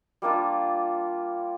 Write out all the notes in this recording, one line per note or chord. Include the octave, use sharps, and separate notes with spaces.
G3 A#3 D4 F4